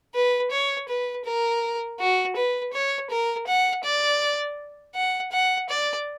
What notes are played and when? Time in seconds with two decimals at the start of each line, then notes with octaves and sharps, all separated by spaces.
0.14 B4
0.51 C#5
0.89 B4
1.25 A#4
1.99 F#4
2.36 B4
2.73 C#5
3.10 A#4
3.47 F#5
3.84 D5
4.94 F#5
5.32 F#5
5.69 D5